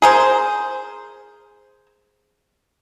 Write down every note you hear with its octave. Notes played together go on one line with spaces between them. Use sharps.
G#4 A#4 C5